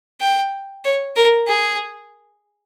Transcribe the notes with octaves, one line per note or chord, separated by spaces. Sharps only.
G5
C#5
A#4
G#4